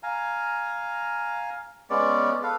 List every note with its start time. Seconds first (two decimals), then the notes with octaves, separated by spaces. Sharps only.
0.03 F5 G#5 A#5
1.90 G#3 B3 C#4 D5
2.43 A4 B4 F5